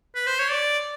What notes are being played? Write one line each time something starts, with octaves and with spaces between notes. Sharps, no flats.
B4
C5
C#5
D5